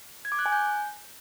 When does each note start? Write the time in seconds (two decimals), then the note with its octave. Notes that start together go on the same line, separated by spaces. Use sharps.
0.25 G#6
0.32 D6
0.39 F#6
0.46 G#5
0.52 G6